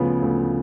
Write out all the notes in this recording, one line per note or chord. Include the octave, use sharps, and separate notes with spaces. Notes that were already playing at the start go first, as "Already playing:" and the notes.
Already playing: D2 C#3 F3 B3
D2